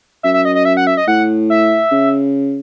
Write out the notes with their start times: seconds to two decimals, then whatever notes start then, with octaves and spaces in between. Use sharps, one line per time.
0.23 F#2 E5
0.34 E5
0.45 D#5
0.55 D#5
0.65 E5
0.77 F#5
0.87 E5
0.97 D#5
1.07 A2 F#5
1.50 E5
1.92 C#3